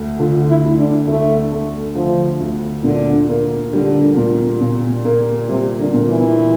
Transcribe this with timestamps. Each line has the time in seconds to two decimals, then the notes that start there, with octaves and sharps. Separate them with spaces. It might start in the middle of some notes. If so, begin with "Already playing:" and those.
Already playing: D2 A3
0.19 D3 F4
0.48 E4
0.64 D2
0.78 D4
1.07 D2 A3
1.52 A3
1.95 D3 F3
2.40 D2
2.84 A#2 D3
3.29 A#3
3.73 D3 G3
4.16 A#2
4.61 A#2
5.05 A#3
5.49 C3 G3
5.79 D3
5.94 A#2
6.08 E3